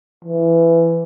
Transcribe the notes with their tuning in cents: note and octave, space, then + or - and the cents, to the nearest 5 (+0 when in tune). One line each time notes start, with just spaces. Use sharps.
E3 +15